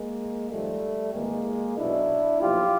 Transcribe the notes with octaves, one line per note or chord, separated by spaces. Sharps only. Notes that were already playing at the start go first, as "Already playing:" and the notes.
Already playing: G#3 A#3
G#1 G#2 F3 G3 A3
G#1 G#2 E3 G#3 A#3
B1 B2 F#3 D4 E4
B1 A#2 F3 F4 G4